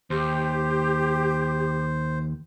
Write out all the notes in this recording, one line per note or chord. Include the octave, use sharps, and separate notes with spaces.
D#2 G4 C5